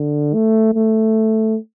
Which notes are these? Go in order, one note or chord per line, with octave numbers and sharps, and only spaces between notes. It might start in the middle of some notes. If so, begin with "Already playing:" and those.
Already playing: D3
A3
A3